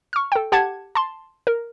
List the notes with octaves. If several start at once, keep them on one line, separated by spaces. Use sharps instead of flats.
C#6 F6
A4 G5
G4 F#5 A5 G#6
A5 C6
A#4